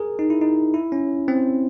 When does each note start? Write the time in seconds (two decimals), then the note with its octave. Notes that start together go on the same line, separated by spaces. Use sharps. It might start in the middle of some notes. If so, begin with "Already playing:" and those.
Already playing: G#4 A#4
0.19 D#4
0.30 E4
0.42 D#4
0.74 E4
0.92 C#4
1.28 C4